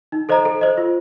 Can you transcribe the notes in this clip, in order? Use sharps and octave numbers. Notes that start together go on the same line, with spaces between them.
D#4
A4 C5 D#5 A#5
A4
C5 D#5
F4